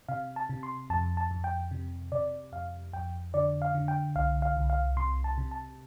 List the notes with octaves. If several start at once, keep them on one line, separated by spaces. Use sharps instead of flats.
C3 F5
A5
C3
C6
F2 A5
A5
F2
G5
C3
C3 D5
F2 F5
F2 G5
D3 D5
F5
D3
G5
C2 F5
F5
C2
F5
C3 C6
A5
C3
A5